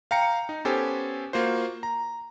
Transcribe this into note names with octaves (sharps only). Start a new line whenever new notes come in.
F5 G5 A#5 C#7
D#4
B3 C#4 G4 A4 C5 G#5
A#3 F4 F#4 C5
A#5